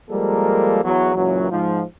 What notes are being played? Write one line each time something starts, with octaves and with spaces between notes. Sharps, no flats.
F3 G3 G#3 A#3 A4 A#4
E2 F#3
C#2 F#2 A#2 E3 F#3
G#2 F3